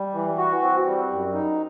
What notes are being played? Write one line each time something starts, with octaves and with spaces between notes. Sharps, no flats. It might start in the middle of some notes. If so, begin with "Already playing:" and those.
Already playing: G3
E3
F#4
C4
G3
F#2
D#4